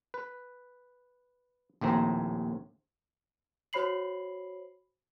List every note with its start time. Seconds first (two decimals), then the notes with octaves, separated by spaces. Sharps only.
0.14 B4
1.81 A#1 D#2 A2 C4 A#5
3.73 F#4 C5 C#5 B5 C7 F#7